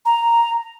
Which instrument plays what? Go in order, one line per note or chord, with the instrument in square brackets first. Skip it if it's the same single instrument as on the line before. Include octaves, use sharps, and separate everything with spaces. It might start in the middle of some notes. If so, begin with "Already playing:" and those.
[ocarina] A#5